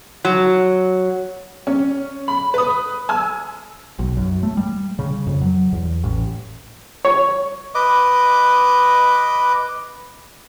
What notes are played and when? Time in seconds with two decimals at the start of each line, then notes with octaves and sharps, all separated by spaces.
0.25 F#3
1.67 C#4
2.28 B5
2.54 B4 D#6
3.09 G#5 E6
3.99 B1
4.17 F#2
4.43 A3
4.57 G3
4.99 C#3
5.26 F2
5.42 F#3
5.72 E2
6.04 A1
7.05 C#5
7.75 B4 D#5 D6